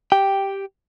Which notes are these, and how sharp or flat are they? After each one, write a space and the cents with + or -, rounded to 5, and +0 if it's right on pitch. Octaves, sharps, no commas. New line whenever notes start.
G4 +0 G5 +0